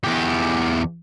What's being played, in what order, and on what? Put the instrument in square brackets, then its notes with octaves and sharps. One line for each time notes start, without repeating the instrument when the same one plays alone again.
[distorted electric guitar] E2 G4